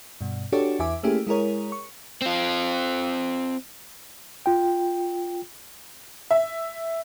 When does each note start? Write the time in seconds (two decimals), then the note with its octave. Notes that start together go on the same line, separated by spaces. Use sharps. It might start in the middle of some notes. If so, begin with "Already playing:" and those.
0.21 G2 B2
0.52 D4 F#4 G4 A4 C#5 D5
0.79 E2 E4 E5 G#5 D6
1.03 A3 A#3 C#4 E4 G4 G#4
1.27 G#3 E4 G#4 A#4 C#5
1.72 C#6
2.22 C4 F4
4.46 F4 G5
6.31 E5